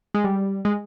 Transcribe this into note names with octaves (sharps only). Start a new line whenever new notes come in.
G#3
G3
G#3